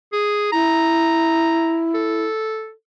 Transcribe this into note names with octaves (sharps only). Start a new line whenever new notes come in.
G#4
E4 A#5
A4